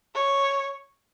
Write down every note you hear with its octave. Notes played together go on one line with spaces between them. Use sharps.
C#5